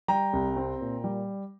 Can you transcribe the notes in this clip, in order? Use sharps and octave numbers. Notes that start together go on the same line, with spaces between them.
G3 G5 A#5
C2
C4
A#2
G3